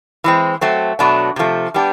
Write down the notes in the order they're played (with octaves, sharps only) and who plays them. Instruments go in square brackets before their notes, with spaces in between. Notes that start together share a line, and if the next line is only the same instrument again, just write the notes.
[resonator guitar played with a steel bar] E3 G#3 C4
F#3 A3 C4
B2 F#3 A3 D4
C3 F3 A3
G3 B3 D4 G4